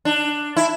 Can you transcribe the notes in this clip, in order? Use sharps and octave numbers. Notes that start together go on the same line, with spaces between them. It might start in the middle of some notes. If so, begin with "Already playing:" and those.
D4
E4